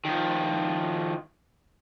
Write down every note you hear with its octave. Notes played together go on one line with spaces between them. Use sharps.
D#3 F3